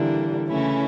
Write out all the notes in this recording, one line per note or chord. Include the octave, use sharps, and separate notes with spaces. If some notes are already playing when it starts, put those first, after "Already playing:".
Already playing: D3 E3 G3 A#3 D4
C#3 E3 A3 C#4 E4